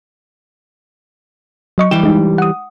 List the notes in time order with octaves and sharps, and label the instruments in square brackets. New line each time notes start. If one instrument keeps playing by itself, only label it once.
[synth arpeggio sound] F#3 D#5 C#6
[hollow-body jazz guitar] E3 G3 G4 [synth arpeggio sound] E7
[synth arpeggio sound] G#3 D#4
F#5 D#6